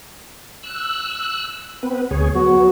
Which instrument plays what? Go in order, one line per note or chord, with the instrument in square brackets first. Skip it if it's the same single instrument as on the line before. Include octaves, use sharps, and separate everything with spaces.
[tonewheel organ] E6 F#6
B3 C4 B4
D2 G#4 C#5
[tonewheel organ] F#3 B3 [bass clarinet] F#4